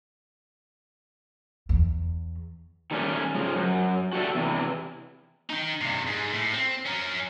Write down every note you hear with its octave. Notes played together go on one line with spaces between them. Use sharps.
E2
D#3 G3 A3 C#4
C#3 F3 G#3
F#2
F#4 G4 A4 C#5 D5 E5
E2 C3 E3
D#4 G5
G2 C3
G#2
A2
C4
C#4 A#4